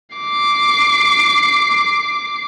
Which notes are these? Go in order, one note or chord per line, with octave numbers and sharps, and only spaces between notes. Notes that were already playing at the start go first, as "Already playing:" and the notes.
D6 C7